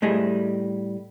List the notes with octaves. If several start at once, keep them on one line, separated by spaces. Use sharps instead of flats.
A2 G3 A3 G#4 D#5 E5